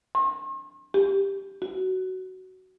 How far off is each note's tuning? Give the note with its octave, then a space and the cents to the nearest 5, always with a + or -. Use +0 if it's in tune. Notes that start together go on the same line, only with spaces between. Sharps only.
C6 +45
G4 +10
F#4 +15